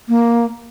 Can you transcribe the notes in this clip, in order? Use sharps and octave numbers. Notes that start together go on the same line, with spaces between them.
A#3